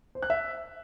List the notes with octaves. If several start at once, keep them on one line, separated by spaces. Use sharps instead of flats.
C5
F#6
E5